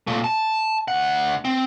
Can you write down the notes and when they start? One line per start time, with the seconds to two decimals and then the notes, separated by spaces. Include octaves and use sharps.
0.07 A#2 A3
0.24 A5
0.88 D2 F#5
1.45 C4